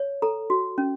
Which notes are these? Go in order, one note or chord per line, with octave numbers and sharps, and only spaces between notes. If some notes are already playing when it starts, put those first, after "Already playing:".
Already playing: C#5
A4 A#5
F#4
C#4